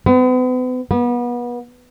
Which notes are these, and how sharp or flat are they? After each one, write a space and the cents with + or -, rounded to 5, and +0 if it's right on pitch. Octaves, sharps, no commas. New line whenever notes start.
B3 +40
B3 -30